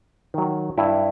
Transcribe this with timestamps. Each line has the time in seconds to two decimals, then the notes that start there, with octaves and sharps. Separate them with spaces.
0.34 D#3 F#3
0.78 G2 E4